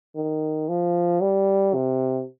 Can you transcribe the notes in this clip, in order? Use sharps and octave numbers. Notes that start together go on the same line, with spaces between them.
D#3
F3
G3
C3